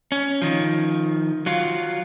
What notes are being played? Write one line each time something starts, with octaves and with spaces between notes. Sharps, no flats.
C#4
D#3 F3
F#3 F4